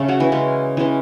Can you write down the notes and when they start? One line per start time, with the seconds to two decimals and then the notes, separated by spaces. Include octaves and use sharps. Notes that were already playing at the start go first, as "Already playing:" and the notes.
Already playing: C#3 A3 C#4 A4
0.08 F#3 F#4
0.20 E3 E4
0.32 C#3 G#3 C#4
0.77 E3 G#3 C#4